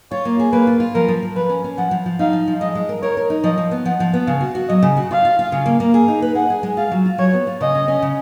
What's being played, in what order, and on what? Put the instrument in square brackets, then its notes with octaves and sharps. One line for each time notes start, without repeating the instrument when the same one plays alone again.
[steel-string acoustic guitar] F4 [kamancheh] C#5
[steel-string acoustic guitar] A#3
G#4
[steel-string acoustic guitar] A#3 [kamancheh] B4
[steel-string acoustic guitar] F4
F4
[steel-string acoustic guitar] F3 [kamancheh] A#4
[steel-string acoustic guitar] F3
F3
[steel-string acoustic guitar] F3 [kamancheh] B4
[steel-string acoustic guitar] C#4
C#4
[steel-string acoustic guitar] F3 [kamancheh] F#5
[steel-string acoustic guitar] F3
F3
[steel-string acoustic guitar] D#4 [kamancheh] F5
[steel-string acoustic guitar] F3
F3
[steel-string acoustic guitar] G#3 [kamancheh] D#5
[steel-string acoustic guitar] G#3
A#4
[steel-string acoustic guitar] A#4 [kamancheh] C#5
[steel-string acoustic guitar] A#4
D#4
[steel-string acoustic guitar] F3 [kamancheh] D#5
[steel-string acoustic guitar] F3
B3
[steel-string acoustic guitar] F3 [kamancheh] F#5
[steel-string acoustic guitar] F3
B3
[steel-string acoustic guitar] C#3 [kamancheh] F5
[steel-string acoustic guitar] F#4
F#4
[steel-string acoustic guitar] F#3 [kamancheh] D#5
[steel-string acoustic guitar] C#3
F#4
[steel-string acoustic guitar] F4 [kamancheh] F5
[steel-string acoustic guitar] F4
F4
C#3
A#3
A#3
G#4
D#4
B4
[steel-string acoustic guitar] G#4 [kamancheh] F#5
[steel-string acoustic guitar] G#4
G#3
[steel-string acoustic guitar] F4 [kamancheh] F5
[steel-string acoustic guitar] F#3
F4
[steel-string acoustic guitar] F#3 [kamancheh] C#5
[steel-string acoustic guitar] B3
F4
[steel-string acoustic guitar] C#3 [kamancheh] D#5
[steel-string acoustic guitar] C#4
C#4
C#3